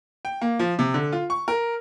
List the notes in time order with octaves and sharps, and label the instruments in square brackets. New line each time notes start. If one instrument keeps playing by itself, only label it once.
[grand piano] G5
A#3
F3
C3
D3
F4
C#6
A#4